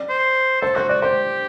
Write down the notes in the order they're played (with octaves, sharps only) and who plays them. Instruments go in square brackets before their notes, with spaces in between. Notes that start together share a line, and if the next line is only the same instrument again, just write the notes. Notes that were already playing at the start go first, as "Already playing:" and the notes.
Already playing: [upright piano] D5
[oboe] C5
[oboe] A4 [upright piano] C5
[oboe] F#4 [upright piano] C5
[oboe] F#4 [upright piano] D5
[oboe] G4 [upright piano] C5